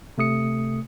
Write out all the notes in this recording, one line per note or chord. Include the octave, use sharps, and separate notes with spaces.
C3 A3 D#6 C#7